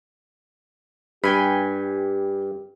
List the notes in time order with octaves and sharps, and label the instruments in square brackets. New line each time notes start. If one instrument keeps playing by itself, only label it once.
[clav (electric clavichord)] G2 [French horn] G4 [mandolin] G5 G#5 B5